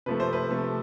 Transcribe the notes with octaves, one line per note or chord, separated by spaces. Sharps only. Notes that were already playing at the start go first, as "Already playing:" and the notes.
C3 F3 A3 B4
C5
B4
C3 F3 A3